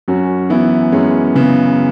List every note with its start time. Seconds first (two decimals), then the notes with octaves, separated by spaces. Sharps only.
0.08 F#2 C#4 F#4
0.50 E3 B3 E4
0.92 F#2 G#3 C#4
1.35 C#3 B3